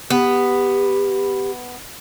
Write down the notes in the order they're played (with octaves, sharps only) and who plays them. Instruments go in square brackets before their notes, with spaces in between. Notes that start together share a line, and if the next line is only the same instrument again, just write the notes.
[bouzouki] B3 [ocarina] G4